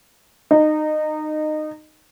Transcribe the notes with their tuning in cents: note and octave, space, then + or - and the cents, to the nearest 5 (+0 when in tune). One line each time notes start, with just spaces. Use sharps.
D#4 -20